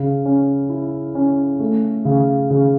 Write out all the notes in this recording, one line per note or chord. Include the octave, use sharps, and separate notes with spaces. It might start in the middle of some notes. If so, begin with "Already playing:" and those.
Already playing: C#3
C#4
E4
C#4
A3
C#3
C#3